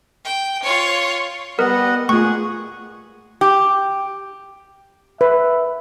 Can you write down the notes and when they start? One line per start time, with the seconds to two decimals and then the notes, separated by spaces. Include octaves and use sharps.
0.24 G5
0.63 F4 C#5
1.59 G3 B3 A#4 D#5 F#5
2.09 A#2 G#3 A3 F4 G#4 F#5 C#6
3.41 G4
5.21 B4 E5